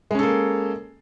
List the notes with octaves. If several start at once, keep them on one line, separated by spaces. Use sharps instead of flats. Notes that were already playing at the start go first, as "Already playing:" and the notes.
G#3 A#3 C#4 A4